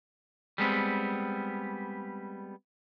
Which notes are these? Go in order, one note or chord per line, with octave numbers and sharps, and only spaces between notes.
G3 G#3 B3 C4